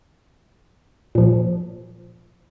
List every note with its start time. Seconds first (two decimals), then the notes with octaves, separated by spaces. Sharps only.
1.15 A#2 F3